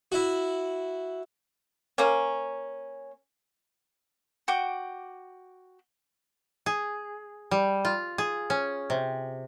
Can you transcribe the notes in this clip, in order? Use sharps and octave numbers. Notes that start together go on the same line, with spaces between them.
E4 F#4
A#3 C#4
F#4 G5 D6
G#4
G3
F4
G#4
C#4
C3